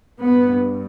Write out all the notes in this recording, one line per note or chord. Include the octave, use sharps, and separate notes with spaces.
G2 B3